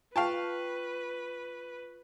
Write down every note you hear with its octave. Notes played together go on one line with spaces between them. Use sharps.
F4 B4 F5 G5 A5 C#6